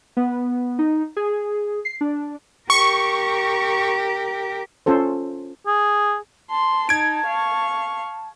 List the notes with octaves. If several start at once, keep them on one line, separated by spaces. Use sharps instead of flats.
B3
D#4
G#4
C7
D4
G4 A#4 C#6
C#4 F4 A4 C5
G#4
A5 C6
D#4 G#6 D7
F5 C#6